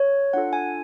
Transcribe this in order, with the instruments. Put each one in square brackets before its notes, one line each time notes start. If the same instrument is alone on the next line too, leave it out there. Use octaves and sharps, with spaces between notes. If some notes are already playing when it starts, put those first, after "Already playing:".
Already playing: [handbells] C#5
D4 F4 A4 F#5
G#5